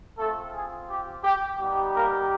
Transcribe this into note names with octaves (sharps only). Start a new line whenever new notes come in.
A3 C4 F4 A4
G#4
G4
G4
G3 B3 D#4 G4
A#3 A#4